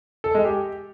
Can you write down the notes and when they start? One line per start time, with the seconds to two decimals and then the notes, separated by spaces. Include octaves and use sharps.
0.24 A4
0.34 G#3
0.45 G4